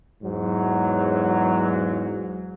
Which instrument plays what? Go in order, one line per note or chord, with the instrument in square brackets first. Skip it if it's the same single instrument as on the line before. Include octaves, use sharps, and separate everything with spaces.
[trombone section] E2 G#2 F#3